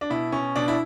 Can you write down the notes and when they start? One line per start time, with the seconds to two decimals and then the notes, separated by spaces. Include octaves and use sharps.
0.01 D4
0.10 B2 E4
0.32 B2 C#4
0.56 B2 D4
0.68 E4